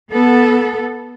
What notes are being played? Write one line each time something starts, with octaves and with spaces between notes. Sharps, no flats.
B3 A4